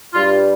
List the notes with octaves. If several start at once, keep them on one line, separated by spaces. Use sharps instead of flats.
G2 G3 F4